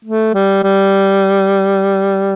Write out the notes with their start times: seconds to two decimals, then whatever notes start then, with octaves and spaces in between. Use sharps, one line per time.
0.05 A3
0.34 G3
0.63 G3